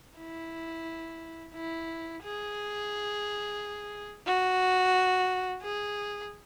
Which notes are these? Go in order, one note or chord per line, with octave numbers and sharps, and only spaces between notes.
E4
E4
G#4
F#4
G#4